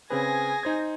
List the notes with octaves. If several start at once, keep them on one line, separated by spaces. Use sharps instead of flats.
C#3 C4 G#4 B4 G#5 A#6
D#4 C5 G#6